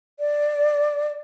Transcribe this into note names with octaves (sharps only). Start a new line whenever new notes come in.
D5